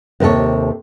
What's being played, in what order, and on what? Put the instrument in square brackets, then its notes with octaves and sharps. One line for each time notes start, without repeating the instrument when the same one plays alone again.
[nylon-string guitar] D#2 C3 D#4 A4 C#5